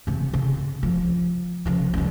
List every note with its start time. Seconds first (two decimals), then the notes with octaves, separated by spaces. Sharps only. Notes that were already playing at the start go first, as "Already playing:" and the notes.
0.07 C#3 C4
0.33 C#3
0.83 F3
1.66 C#3 F3
1.94 C#2 G3